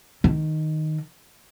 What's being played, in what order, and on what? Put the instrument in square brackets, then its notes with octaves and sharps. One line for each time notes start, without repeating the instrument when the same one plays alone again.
[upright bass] D#3